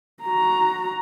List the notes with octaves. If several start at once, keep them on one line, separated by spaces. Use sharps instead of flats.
F#4 A#5